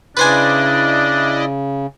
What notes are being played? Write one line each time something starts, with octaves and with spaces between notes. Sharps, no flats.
C#3 D4 E4 B4 C5 D5 D#5 G#5